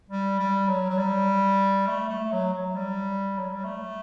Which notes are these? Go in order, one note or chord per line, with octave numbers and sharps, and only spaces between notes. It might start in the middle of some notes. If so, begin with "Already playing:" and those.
G3
G3
F#3
F#3
G3
A3
A3
F#3
F#3
G3
F#3
G3
A3